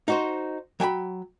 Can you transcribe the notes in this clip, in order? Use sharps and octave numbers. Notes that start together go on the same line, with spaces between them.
D#4 F#4 C5
F#3 G5 G#5 B5